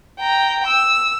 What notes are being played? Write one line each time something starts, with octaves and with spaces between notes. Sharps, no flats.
G5 A#5
E6